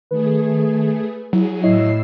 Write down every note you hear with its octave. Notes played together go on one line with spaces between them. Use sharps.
D#3 A3 G#4 B4
F#3 E4 G#4
A2 E4 C#5 D#5 E6 C7